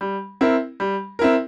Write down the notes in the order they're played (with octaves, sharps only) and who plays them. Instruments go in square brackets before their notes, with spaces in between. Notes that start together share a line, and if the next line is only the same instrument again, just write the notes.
[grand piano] G3
C4 E4 A#4
G3
C4 E4 A#4